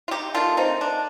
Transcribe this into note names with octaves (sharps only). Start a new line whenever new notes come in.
F4
D#4 G4
D#3 A3 D4 F4
C4 D#4
D4